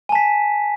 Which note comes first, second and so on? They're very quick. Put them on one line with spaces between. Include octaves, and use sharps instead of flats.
G#5 A5 B6